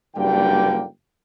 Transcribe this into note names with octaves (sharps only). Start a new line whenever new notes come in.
F#1 G2 D3 G3 A#3 G5